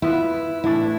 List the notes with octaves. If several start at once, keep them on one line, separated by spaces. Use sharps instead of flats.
B3 E4 F4 B4
A2 E3 A3 D4 E4